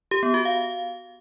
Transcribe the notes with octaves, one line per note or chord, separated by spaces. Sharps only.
G4
B3
F#4
F5